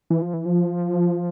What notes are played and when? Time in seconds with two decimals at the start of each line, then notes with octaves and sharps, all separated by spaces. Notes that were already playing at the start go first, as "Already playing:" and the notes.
0.10 E3
0.22 F3
0.33 E3
0.46 F3